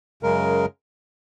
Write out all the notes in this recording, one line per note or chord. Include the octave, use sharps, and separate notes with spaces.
F#2 C#3 G#3 A#4